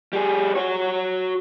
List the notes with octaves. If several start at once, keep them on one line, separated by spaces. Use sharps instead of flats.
G3 G#4
F#4 C#5